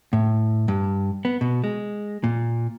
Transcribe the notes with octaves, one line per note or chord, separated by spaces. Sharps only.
A2
G2
B3
B2
G#3
A#2